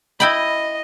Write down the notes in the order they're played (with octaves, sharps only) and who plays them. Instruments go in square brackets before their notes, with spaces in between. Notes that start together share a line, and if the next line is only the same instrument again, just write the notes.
[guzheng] E4 G5 B5 [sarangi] D#5